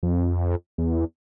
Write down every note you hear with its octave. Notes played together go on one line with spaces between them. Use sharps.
F2
E2